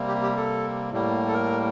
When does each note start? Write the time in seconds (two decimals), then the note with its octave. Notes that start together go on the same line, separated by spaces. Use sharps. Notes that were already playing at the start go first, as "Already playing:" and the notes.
Already playing: C3 G3 A#3
0.08 G4
0.23 G4
0.37 A4
0.92 A2 G3 A#3
1.28 A4
1.34 A#4